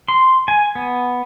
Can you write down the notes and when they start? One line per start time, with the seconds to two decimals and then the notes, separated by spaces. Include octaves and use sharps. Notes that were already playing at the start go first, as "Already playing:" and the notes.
0.08 C6
0.48 G#5
0.75 B3